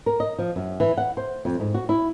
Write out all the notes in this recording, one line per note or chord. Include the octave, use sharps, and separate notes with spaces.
A#4
D#5
F3
F#2
E3
F#5
C5
F2
G#2
F#4
E4